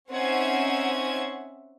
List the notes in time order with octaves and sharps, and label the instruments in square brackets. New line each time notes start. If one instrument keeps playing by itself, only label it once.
[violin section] C4 C#4 D#4 E5 F#5 G#6